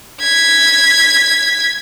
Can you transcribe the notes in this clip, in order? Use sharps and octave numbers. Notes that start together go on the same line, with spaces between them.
G#6 B6